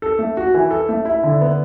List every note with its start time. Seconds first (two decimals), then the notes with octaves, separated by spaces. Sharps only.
0.02 A4
0.19 A3
0.37 F#4
0.54 E3
0.71 A4
0.89 A3
1.05 E4
1.23 D3
1.41 B3